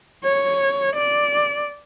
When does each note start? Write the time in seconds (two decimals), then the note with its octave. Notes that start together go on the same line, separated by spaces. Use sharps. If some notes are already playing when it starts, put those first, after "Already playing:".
0.24 C#5
0.96 D5